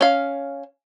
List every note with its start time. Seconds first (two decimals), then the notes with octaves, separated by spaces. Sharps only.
0.01 C#4 F5